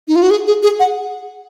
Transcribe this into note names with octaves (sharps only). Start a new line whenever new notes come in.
D#4
F4
F#4
G#4
G#4
G#4
F#5